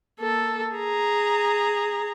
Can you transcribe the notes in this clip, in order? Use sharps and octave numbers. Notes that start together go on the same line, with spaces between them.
A#3 A4
G#4 A#5